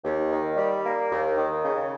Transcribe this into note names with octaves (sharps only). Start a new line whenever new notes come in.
D#2
D#3
G3
A#3
D#2
D#3
C#3